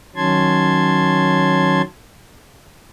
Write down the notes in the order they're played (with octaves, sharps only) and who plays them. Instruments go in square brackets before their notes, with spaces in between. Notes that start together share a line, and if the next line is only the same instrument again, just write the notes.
[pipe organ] D#3 F#3 C#4 A5 C6 G#6